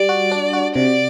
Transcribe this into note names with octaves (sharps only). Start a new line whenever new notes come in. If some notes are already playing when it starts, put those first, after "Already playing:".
Already playing: G3 D5
F#4
D4
F#4
C3 D5